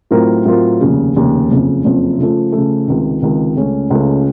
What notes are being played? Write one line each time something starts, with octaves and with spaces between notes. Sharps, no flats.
A2 F#3 C4 F4 A#4
A2 F#3 C4 F4 A#4
F1 D#2 C#3
F1 D#2 C#3
F#1 F2 C#3
F#1 F2 C#3
C#3 F3 A3
C#3 F3 A3
C#2 C3 D#3
C#2 C3 D#3
C#2 C#3 A3 C#4
C#2 C#3 A3 C#4